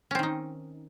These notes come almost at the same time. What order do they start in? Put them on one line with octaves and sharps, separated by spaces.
C#4 C4 D#3 D#4